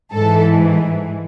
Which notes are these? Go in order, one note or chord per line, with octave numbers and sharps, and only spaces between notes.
G#2 E3 A4